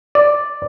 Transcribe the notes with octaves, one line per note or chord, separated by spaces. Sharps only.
D5